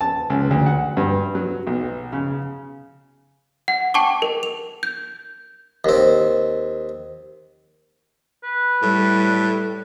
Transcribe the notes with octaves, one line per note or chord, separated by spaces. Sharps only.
A5
C#2
D2
F#5
G2
F#3
B1
C#3
F#5
G5 A5 C#6 D6
A#4
F7
G6
D#2 C4
B4
A2 G3